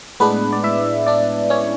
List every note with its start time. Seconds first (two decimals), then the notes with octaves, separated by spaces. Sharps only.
0.20 A2 G#3 B3 D4 B4
0.53 D5
0.63 E4 E5
1.06 D4 D5
1.50 C#4 C#5